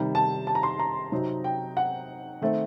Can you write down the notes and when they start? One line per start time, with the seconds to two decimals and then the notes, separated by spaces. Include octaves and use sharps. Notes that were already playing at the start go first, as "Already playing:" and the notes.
Already playing: C3 D#3 G3
0.15 A5
0.47 A5
0.55 A#5
0.63 C6
0.79 A#5
1.12 C3 F#3 C4 D#4
1.44 G5
1.77 F#5
2.42 D#3 A3 C4